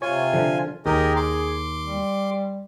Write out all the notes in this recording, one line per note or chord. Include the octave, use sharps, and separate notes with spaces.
C3 F4 C#5 G#5
D3 F3
D#2 G4 G#4 A#4 D#5
C6 D6
G3